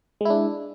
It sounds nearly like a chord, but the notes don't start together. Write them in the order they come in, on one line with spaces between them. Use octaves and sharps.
G#3 E4 D4